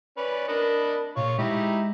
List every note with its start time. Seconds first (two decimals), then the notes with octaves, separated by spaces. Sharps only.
0.17 C#4 B4 D5
0.48 D4 A#4 D#5 B5
1.16 A#2 F4 C#5
1.38 G#3 D#4 E4 G4